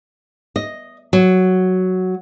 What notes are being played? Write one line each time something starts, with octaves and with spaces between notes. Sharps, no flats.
D#5
F#3